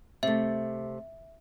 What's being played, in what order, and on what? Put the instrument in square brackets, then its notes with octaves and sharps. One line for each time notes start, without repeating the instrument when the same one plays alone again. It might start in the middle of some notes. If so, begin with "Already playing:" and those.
[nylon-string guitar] C3 A3 [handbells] E5